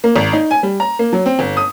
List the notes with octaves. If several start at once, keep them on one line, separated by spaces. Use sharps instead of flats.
A#3
G#1
D#4
G#5
G3
A#5
A#3
F#3
C4
G1
D#6